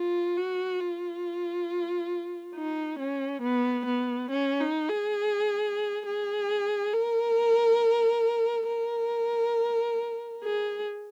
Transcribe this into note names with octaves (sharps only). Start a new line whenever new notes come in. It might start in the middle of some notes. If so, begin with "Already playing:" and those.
Already playing: F4
F#4
F4
D#4
C#4
B3
B3
C#4
D#4
G#4
G#4
A#4
A#4
G#4